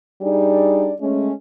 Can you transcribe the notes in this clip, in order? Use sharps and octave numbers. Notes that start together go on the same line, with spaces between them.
G3 D4 D#4 G#4 D5
G#3 A3 C#4